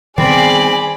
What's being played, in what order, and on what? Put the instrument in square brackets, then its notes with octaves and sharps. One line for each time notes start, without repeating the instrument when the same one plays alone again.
[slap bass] D#3 G3 B3 [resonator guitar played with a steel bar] C4 [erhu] G#4 [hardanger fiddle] D5 B5